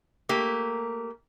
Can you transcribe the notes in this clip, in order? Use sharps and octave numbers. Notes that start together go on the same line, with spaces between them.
A3 A#3 G4